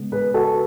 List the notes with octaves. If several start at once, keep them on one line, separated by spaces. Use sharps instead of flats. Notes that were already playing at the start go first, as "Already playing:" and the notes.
Already playing: C#3 G#3 B3
G#4 B4
F#4 A4